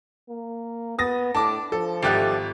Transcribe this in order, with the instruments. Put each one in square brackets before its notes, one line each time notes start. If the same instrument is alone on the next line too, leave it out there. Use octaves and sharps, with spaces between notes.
[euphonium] A#3
[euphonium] B3 [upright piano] D#6 A6 A#6
[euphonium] A2 [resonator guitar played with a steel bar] D4 [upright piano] A5 D6
[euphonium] F3 [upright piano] A4
[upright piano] G#1 G4 F#6 [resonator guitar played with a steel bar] G3 A3 D#4